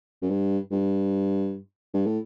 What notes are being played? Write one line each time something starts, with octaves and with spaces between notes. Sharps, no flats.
F#2
G2
G2
G2
A2